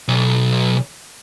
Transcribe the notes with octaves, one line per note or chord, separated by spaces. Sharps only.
B1